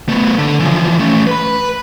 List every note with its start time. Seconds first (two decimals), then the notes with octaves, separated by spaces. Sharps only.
0.09 A3 B3
0.38 D3
0.60 E3 F3
0.99 A3 C#4
1.27 B4 B5